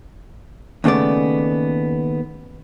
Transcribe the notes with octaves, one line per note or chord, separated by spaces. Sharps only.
D#2 C#3 A3 B3 D5